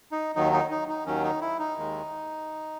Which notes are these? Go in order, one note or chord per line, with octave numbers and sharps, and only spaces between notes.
D#4
D#2 D#3 F#3 D#4
D#4
D#4
D#4
D#2 D#3 F#3 C#4
D#4
E4
D#4
D#2 D#3 G#3